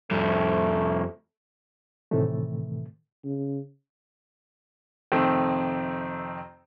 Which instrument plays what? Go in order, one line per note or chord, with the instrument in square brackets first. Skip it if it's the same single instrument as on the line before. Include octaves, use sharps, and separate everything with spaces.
[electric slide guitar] F2 G3 [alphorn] A3
[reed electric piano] A2 C3 D#3 E3 A3
[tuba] C#3
[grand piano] F2 C3 D#3 A3 C4